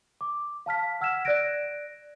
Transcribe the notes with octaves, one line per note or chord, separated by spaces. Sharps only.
D6
F5 A5 F6 B6
F#5 E6 F6 G#6 B6 E7
D5 F#6 G#6 A#6 D7